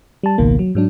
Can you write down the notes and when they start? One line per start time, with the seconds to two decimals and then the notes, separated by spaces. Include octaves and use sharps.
0.23 G3 A5
0.38 G#1 C#2 B2 D#3 A#3
0.59 F#3
0.75 G#2 F#3 D4